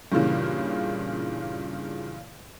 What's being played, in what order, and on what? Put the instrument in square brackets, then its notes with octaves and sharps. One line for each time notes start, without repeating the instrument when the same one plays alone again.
[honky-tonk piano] G2 A#2 C#3 E3